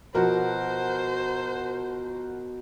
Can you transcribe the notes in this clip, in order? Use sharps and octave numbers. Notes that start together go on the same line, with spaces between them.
B2 F3 F#4 A#4 C5